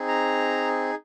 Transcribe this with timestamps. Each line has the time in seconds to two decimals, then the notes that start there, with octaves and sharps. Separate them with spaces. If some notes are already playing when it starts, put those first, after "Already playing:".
Already playing: C4 D#4 G#4
0.08 A#5